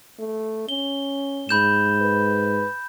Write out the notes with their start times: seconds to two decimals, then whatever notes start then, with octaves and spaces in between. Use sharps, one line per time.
0.19 A3
0.69 C#4 G7
1.49 G#2 B5 G6 E7
2.02 B4